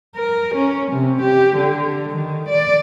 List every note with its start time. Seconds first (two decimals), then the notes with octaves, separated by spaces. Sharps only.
0.15 A#4
0.55 C#4
0.92 C3
1.22 G4
1.57 D3
2.12 D#3
2.49 D5